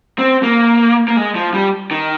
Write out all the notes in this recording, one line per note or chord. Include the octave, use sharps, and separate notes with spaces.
C4
A#3
A#3
G#3
F3
G3
D#3